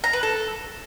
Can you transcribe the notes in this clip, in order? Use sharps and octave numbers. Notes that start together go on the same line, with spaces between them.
A#5
B4
A4